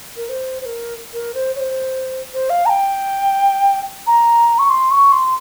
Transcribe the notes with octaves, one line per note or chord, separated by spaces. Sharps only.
A#4
C5
C5
A#4
A#4
C5
C#5
C5
C5
F5
A#5
G5
A#5
C#6
C6
C#6
C6